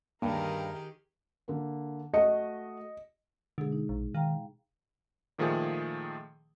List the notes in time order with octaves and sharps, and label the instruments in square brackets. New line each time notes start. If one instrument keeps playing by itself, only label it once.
[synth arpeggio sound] D2 A#3 [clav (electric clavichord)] G2 [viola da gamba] D#3 G4 G#4 [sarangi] A#4
[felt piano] D3 A#3
[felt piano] A3 F#4 C#7 [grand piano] D#5
[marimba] B2 G#3 G#4 [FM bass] D3
[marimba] D#4
[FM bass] A#1
[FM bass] D#3 [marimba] F5 G5 A#5
[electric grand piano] A#2 D#3 F3 A3 G#4